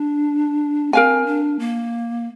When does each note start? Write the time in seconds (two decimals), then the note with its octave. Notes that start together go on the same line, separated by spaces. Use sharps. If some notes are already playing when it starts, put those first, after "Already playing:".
Already playing: D4
0.93 C4 A#4 F5 G#5
1.26 D4
1.59 A#3